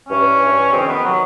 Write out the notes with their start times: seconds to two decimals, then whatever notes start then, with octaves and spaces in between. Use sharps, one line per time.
0.08 G2 E3 C#4
0.40 G2 E3
0.72 F2 C3 D#3 C4
0.87 B3
1.03 C3 D#3 F#3